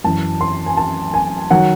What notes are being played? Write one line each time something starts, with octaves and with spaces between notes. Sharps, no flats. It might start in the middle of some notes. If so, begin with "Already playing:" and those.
F#2 E3 A5
C6
G#5
A5
G#5
D#3 F#3 F#5